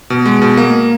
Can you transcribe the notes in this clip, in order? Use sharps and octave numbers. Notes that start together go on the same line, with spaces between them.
B2
G#3
B2
A#3